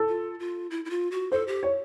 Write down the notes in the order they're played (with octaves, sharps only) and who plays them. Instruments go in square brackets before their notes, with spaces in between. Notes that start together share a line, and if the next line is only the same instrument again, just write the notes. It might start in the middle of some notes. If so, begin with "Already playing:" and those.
Already playing: [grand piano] A4
[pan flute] F4
F4
E4
E4
F4
F#4
[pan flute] A4 [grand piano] C5
[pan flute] G4
[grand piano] C#5